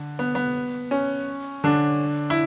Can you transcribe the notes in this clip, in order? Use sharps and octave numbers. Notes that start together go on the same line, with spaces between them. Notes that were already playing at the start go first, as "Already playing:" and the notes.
Already playing: D3
B3
B3
C#4
D3 D4
E4